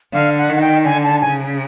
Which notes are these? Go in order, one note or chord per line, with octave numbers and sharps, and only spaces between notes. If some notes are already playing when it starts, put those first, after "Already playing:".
D3 F5
F#5
D#3
F#5
G5
D3 G#5
A5
C#3 G#5